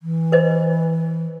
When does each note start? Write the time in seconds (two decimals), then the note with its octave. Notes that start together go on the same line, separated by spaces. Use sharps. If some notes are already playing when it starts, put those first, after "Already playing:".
0.03 E3
0.32 B4 C5 D#5